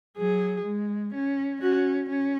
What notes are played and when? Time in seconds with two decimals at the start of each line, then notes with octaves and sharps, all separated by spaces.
0.17 F#3 G#4
0.65 G#3
1.14 C#4
1.61 C#4 F#4
2.09 C#4